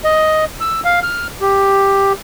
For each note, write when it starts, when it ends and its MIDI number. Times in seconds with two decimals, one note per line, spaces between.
0.04 0.45 75
0.61 0.80 88
0.85 1.00 77
1.03 1.27 89
1.41 2.13 67